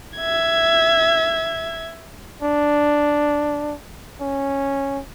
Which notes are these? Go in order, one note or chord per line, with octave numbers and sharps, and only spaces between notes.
E5 G#6
D4
C#4